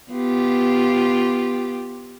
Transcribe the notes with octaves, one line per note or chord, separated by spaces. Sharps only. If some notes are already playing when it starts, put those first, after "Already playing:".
B3 F4 G4